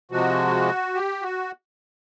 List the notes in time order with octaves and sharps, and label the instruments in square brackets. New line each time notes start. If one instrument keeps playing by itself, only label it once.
[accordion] C3 F3 G#3 F#4
G4
F#4